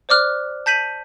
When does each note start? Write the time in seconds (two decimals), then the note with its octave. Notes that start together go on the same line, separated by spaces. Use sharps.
0.09 C5 D5 D6 F6 F#6
0.66 A5 G6 B6 D#7 F#7